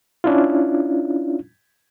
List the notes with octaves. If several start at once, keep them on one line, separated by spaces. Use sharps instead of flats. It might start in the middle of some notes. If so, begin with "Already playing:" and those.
C#4 D4 E4 F4